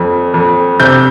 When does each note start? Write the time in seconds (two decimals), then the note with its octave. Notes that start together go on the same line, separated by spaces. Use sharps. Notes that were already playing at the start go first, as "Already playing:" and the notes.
Already playing: F2
0.34 F2
0.80 C3 G6